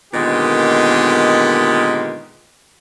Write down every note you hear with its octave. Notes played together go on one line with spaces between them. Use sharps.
A#2 D3 D#3 G#3 B3 G4